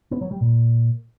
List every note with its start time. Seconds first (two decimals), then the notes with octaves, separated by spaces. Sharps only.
0.11 B3
0.21 F#3
0.31 G3
0.41 A#2